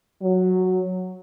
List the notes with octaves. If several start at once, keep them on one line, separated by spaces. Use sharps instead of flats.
F#3